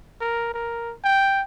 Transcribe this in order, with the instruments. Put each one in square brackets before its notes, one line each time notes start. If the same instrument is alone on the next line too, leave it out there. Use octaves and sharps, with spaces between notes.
[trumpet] A#4
A#4
G5